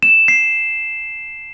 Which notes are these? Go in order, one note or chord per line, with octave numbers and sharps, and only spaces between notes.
E7
C7